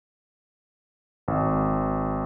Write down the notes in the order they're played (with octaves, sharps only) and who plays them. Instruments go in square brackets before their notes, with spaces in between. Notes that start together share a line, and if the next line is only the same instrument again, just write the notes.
[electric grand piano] G#1